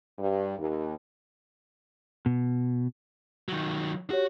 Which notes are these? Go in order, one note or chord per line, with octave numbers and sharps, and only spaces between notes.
G2
D#2
B2
D#3 F#3
F#4 G4 C#5